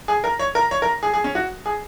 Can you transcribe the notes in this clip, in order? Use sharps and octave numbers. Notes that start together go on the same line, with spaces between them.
G#4
A#4
C#5
A#4
C#5
A#4
G#4
G#4
C#4
F#4
G#4